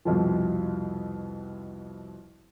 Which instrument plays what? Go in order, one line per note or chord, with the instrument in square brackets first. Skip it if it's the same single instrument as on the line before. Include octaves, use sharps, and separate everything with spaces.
[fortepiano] C2 F2 B2 F3